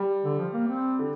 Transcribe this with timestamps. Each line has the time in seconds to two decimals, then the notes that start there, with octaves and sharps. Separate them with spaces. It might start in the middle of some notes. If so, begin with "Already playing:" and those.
Already playing: G3
0.24 D3
0.38 F3
0.53 A#3
0.67 C4
0.99 D3